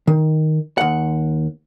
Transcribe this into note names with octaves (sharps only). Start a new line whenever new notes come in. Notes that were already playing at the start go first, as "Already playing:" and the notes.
D#3
D#2 F#5